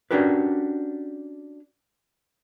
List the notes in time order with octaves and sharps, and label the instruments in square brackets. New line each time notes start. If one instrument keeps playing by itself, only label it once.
[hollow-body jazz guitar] C#4 D4 F#4 G4 A#4 B4